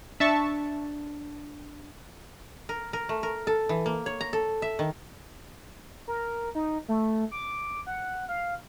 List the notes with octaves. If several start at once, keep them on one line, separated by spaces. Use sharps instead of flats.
D4 E5 A5 C#6
A#4
A#4
A3
A#4
A4
E3
A#3
C#5
A#5
A4
E5
D#3
A#4
D#4
A3
D6
F#5
F5